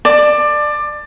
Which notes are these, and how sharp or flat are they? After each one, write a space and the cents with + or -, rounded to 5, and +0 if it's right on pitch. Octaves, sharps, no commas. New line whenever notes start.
D5 +20 A5 +0